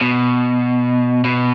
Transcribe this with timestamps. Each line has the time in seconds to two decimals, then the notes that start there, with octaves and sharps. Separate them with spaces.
0.01 B2
1.25 B2